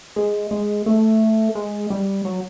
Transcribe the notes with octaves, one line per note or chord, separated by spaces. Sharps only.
G#3
G#3
A3
G#3
G3
F#3